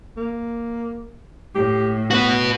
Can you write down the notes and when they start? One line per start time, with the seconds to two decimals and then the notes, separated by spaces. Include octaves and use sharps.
0.17 A#3
1.55 A2 G4
2.11 B3 F#4 B4